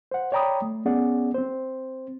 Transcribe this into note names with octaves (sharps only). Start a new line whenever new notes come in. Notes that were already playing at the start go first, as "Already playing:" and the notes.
C5 F#5
C#5 D5 G5 A#5 B5 D#6
A3
B3 C#4 G#4 D5 F#5
C4 C5